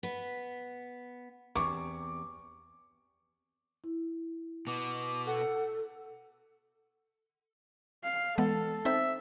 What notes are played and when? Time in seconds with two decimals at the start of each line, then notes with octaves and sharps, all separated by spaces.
0.03 B3 B4
1.55 E2 C3 C#6 D6
3.84 E4
4.67 B2 B3 D6
5.26 A4 F#5
8.03 F5
8.38 E3 G#3 B3 A4
8.85 C4 D#4 C5 E5